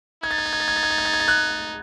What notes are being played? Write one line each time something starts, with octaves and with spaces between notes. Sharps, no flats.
D#4 G#6
A6
G#6
A6
G#6
A6
G#6
A6
G#6
A6
G#6
A6
G#6
A6
F#6 G#6